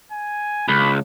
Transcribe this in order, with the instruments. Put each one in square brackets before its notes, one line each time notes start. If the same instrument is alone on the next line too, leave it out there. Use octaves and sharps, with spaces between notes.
[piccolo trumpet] G#5
[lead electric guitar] C#2 [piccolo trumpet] B5